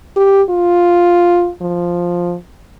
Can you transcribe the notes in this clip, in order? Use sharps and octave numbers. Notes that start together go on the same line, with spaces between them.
G4
F4
F3